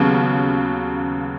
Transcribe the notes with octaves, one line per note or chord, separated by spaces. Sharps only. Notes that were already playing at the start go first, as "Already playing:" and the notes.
Already playing: D#2 C#3 F#3 B3